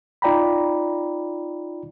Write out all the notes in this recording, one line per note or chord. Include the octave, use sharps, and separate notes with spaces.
D#4 F4 D5 G5 A#5 B5